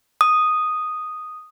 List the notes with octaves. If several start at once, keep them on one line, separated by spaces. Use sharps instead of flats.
D#6